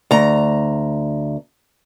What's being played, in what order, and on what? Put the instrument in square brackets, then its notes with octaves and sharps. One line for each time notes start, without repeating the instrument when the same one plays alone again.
[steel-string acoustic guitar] D2 A#5